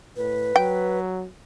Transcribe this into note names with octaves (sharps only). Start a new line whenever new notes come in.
A2 B4
F#3 G5